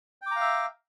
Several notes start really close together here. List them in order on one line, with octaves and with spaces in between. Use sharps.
G5 D6 A#5 F5 E5